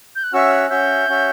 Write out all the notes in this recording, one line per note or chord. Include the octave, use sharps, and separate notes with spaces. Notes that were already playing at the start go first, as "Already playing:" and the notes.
G6
F#6
C#4 F#4 C#5 E5 E6
F#6
C#4 F#4 C#5 E5 G6
C#4 F#4 C#5 E5